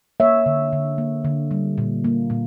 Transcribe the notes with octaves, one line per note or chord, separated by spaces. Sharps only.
A#3 C#5 E5
D3
D3
A#3
D3
G3
A#2
A#3
A#2